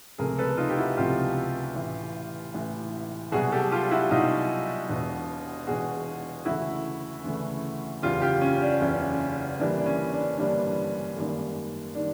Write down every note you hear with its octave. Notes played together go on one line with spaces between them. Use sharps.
C#2 C3 F3 A3 G#4 A#4
A4 B4
D#4 F4
G4
E4 F#4
C#2 C3 F3 A3 F4 G4
A1 A2 E3
A1 A2 E3
C2 B2 F#3 F#4 G#4
G4 A4
F4 G4
E4 F#4
C2 B2 F#3 D#4 F4
E1 E2 B2
E1 E2 B2 F#4 G#4
D2 C#3 E3 A3 E4 F#4
D2 C#3 E3 A3
F#1 E2 C#3 F4 G4
F4 G4
C#4
D4
F#1 E2 C#3 C#4
G1 G2 E3 G3 A#3 D4
D4
C#4
D4
G1 G2 E3 G3 A#3 D4
G#1 F#2 D#3 G3 A#3
D#3 G3 D4